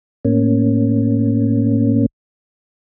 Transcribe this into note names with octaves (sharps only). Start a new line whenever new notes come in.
A2 A#3 C#4